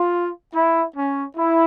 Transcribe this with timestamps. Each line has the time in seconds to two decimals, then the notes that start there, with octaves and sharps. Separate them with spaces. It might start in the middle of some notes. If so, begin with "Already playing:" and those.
Already playing: F4
0.55 E4
0.96 C#4
1.37 E4